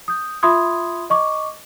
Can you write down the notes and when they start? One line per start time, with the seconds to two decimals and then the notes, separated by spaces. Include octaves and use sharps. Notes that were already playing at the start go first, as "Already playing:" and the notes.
0.08 D#6 G6
0.43 F4 E5 B5 C6 D#6 G#6
1.10 D#5 C#6 D6